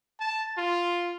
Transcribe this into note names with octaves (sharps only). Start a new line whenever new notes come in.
A5
F4